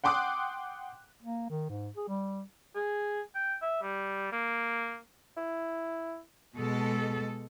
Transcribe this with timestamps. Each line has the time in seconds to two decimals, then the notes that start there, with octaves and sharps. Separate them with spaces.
0.04 F#5 G5 C6 D6 D#6 F#6
1.22 A#3
1.50 D#3
1.70 G#2
1.96 G#4
2.08 G3
2.75 G#4
3.35 G5
3.62 E5
3.83 G3
4.32 A#3
5.37 E4
6.56 B2 G#3 A4